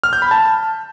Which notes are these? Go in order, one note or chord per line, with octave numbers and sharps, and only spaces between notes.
F6
G6
B5
A5